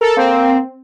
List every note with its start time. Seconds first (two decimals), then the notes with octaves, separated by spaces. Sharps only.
0.01 A4 A#4
0.17 A#3 C4